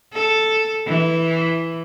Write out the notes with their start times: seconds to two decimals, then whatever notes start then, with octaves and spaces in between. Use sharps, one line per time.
0.13 A4
0.86 E3